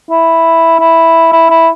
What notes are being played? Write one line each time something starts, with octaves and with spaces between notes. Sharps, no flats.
E4
E4
E4
E4